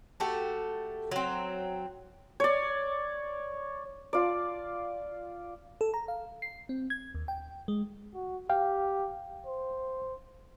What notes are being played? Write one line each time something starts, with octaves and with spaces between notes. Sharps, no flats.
A3 F#4 G4 A4
F#3 C4
C#5 D5
F4 D5
A4
A#5
F5
C7
C4
G#6
D#2
G5
G#3
F#4
G4 F5 G5
C5